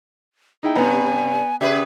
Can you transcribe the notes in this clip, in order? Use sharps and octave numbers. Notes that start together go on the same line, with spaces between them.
D#4 E4 G#4 G5
G2 C3 B3 G#5 A#5
C#3 G4 G#4 B4 E5